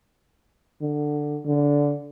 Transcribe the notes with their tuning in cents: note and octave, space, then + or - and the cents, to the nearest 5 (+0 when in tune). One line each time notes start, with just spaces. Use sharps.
D3 +10
D3 -15